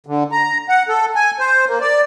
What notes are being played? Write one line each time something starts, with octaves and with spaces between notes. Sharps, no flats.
D3
A#5
F#5
A4
G#5
C5
A#3
D5